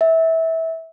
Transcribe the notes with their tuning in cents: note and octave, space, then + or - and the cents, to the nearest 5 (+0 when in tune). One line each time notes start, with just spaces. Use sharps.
E5 -20